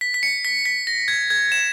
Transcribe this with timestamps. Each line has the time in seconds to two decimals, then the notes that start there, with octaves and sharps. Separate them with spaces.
0.01 B6
0.14 B6
0.23 C#7
0.45 B6
0.65 B6
0.87 A#6
1.08 G#6
1.30 G#6
1.52 E7